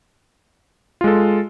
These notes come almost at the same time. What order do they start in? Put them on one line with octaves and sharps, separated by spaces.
F4 G#3 A4